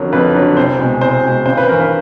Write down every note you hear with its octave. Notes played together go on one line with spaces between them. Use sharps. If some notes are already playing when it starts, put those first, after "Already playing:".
Already playing: F2 D3 F#3 A#4
F2 B4
D3 F#3
C2 C5
B2 G#3
C2 C5
B2 G#3
G#1 C5
B4
G2 E3 A#4
B4